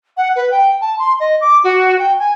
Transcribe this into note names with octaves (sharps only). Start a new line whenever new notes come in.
F#5
B4
G5
A5
C6
D#5
D6
F#4
G5
G#5